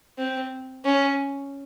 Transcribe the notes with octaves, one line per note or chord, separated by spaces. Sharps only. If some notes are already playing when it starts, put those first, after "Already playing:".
C4
C#4